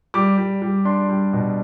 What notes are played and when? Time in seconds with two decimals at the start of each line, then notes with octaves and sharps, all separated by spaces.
0.14 G3 D6
0.37 G3
0.62 G3
0.85 D4 C6
1.09 G3
1.33 B2